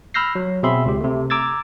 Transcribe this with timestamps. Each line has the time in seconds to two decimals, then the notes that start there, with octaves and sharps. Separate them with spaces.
0.14 B5 E6 F6 G6 A#6 C7
0.35 F#3
0.63 B2 C4 G#4 E5 B5 C6
0.85 C#2 G4
1.01 C3 A3
1.30 A#5 D6 E6 G#6 A6